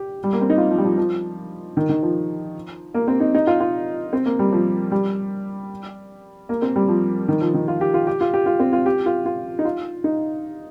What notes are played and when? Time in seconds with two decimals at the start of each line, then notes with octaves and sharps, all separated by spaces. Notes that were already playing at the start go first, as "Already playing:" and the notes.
Already playing: G4
0.24 G3
0.33 A#3
0.41 C4
0.50 D#4
0.58 F4
0.71 F3
0.78 G3
0.84 F3
0.98 F3
1.77 D#3
1.89 D#3
2.03 F3
2.94 A#3
3.08 C4
3.20 D#4
3.35 D#4
3.47 F4
3.60 F4
4.13 C4
4.26 A#3
4.39 G3
4.53 F3
4.92 G3
6.49 A#3
6.62 C4
6.76 G3
6.88 F3
7.28 D#3
7.41 F3
7.54 D#3
7.68 F4
7.81 G4
7.94 F4
8.07 G4
8.21 F4
8.33 G4
8.46 F4
8.59 C4
8.73 F4
8.86 G4
9.06 F4
9.26 F4
9.59 D#4
9.65 F4
10.04 D#4